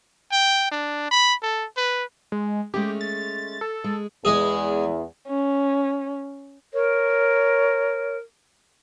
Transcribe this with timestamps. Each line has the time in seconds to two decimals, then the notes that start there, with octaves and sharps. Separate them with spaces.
0.32 G5
0.72 D4
1.11 B5
1.43 A4
1.77 B4
2.32 G#3
2.74 G#3 A3 C#4 G4
3.01 A6
3.61 A4
3.84 G#3
4.25 E2 G#3 G#4
5.29 C#4
6.74 A#4 C#5